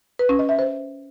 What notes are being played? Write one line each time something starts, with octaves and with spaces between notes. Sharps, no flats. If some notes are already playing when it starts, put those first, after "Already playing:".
B4
C#4
D#5
E5
C5